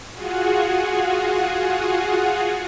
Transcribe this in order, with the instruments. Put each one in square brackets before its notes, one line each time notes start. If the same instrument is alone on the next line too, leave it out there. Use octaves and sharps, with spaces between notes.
[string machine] F4 F#4 G#4 F#5